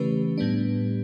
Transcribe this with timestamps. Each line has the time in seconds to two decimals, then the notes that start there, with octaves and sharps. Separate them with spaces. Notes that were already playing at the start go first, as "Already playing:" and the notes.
Already playing: C#3 E3 A3 C#4 G4 B4
0.38 A2 G3 B3 D4